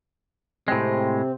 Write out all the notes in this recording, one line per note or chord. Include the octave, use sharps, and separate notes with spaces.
A2 C3 G#3 C4